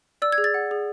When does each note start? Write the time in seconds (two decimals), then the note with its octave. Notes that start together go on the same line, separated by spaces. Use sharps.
0.22 D5 E6
0.32 G#6
0.38 G#4
0.44 A6
0.54 F#5
0.71 G#4